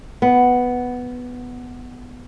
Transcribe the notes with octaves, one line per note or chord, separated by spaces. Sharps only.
B3